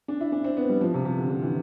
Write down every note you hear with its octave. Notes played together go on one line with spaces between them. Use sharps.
D4
E4
D4
C4
B3
G3
F3
C3
C3
D3
D3
E3